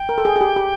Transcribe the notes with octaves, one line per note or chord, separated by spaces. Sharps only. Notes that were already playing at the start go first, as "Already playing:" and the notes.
Already playing: G5
A#4
A4
G#4
G#4
G4
G4